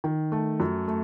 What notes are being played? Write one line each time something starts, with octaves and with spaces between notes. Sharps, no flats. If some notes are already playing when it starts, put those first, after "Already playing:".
D#3
A3
F#2
A3